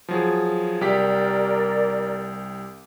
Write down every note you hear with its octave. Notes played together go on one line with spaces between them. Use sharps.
F3 F#3 G#4
C2 G4 A#4 D5 B6